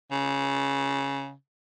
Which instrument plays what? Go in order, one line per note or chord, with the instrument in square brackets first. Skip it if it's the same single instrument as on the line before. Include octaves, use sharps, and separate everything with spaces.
[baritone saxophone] C#3